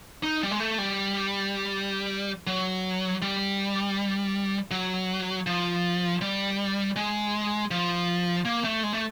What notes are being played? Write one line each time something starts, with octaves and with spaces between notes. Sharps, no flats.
D#4
G3
G#3
A3
G3
F#3
G3
F#3
F3
G3
G#3
F3
A#3
A3
G#3
A3